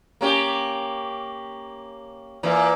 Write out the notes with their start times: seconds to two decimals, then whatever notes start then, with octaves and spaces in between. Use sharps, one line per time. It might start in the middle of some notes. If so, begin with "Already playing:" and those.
0.21 A#3 C#4 G4
2.43 A#2 E3